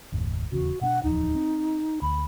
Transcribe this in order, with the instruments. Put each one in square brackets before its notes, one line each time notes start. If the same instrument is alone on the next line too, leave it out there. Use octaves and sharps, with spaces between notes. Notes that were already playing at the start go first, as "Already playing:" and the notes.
[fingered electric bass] F#1 D#2 A2
[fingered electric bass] D#1 E2 C#3 [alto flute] F#4
[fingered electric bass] B2 C4 D4 [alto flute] F#5
[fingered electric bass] D1 E2 F3 [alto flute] D#4
[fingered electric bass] C4
[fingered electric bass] D2 [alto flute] B5